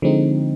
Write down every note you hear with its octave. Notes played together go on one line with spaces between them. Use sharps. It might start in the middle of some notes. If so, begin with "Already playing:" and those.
D3 F3 G#3 C4 D#4